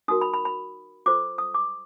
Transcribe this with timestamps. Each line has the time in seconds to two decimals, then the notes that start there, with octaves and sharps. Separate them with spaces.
0.08 D#4 F#4 A#4 D#6
0.21 B5
0.34 B5
0.45 B5
1.06 F4 A4 C5 D6
1.38 D#6
1.54 D6